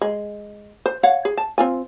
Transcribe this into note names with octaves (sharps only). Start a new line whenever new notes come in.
G#3
C5
C#5 F5 F#5
G#4
A5
C4 F4 G#5